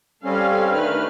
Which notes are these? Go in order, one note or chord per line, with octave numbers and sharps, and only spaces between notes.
G3 C4 C#4 A4 F5
D#3 A3 D4 D#4 B4 F6